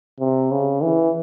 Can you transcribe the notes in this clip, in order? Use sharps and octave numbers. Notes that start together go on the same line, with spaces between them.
C3
C#3
E3